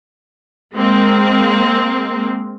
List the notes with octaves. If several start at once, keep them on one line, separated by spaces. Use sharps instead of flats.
G#3 A#3 C4